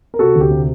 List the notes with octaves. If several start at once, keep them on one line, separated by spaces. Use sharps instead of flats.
A#4
C3 F#4 A4
D2
G4
C3